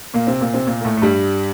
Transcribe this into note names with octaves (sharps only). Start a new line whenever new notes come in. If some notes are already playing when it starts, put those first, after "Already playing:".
A#2 A#3
C3 C4
A#2 A#3
C3 C4
A#2 A#3
A#3
A2 A3
A3
G2 G3